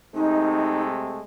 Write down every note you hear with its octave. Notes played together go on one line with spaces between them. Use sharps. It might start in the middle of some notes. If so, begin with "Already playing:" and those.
C3 G#3 A3 D#4